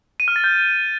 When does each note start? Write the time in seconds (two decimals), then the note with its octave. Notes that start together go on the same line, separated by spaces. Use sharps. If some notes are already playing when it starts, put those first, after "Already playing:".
0.20 D#7
0.28 F6
0.36 A6
0.44 G6